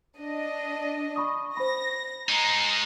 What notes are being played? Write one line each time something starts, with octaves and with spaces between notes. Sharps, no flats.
D4 D#5
B5 C#6 D#6
C5 B5 A#6
G#3 D#4 A#5